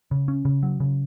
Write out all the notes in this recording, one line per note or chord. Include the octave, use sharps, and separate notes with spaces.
C#3
C#4
C#3
F#3
C#3